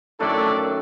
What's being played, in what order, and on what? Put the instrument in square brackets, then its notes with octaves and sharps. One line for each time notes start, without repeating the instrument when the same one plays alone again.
[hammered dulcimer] F#2 D#3 A3 [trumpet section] D4 E4 D5 [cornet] A4